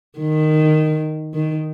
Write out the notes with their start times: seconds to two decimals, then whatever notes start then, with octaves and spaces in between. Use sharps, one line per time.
0.18 D#3
1.34 D#3